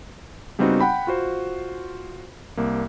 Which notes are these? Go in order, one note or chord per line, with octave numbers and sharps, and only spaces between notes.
C#3 G3 B3 C4 D#4 F#4
F#5 G5 B5
F4 F#4 C5
C2 A#3